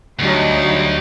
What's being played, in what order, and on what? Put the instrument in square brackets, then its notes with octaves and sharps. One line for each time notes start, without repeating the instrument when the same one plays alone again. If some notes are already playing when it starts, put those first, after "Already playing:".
[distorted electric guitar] D2 [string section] F#3 G3 D#4